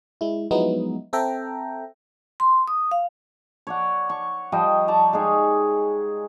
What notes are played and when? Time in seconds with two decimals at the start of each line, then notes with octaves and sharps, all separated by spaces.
0.21 G#3 E4
0.51 F3 F#3 G#3 B3 D#4 E4
1.13 C4 A4 E5 G5 A#5
2.40 C6
2.68 D#6
2.91 F5
3.67 C#5 D5 F#5
4.10 C#6
4.52 F3 G3 D#5 G5
4.88 D5 A5 A#5 C#6
5.13 G#3 D#4 G#4 C#5